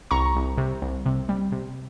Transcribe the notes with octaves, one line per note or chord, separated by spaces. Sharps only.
C2 A#5 C#6
C2
C3
C2
C3
G3
C3